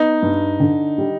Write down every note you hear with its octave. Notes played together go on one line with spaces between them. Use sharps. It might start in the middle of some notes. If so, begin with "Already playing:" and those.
Already playing: B3 D#4
G2
D3
G3